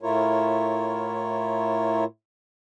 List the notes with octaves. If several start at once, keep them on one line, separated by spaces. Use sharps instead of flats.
A2 A3 E4 F4 A#4 C#5